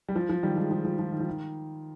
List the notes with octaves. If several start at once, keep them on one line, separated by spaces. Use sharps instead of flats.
G3
F3
F3
D#3 G3
F3 G#3
F3 G#3
F3
F3
D#3
F3
D#3